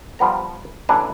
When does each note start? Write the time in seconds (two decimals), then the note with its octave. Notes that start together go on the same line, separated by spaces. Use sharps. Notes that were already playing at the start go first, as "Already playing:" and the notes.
0.19 F3 G3 B3 A#5
0.89 A1 D4 A4 B4 G#5 A#5